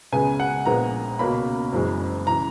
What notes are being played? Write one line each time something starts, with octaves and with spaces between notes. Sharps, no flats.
C#2 C#3 G#3 B3 G#5
F#5
A#1 A#2 G#3 B3 A#5
C#2 B2 A#3 C#4 B5
F#1 F#2 E3 G#3
C#3 E3 A#5